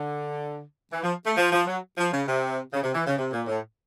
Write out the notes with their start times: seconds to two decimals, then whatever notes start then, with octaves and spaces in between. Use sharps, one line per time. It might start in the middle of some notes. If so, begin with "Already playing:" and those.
Already playing: D3
0.92 E3
1.03 F3
1.25 A3
1.37 F3
1.52 F3
1.67 F#3
1.98 F3
2.12 C#3
2.27 C3
2.72 C#3
2.83 C3
2.95 E3
3.06 C#3
3.18 C3
3.33 A#2
3.47 A2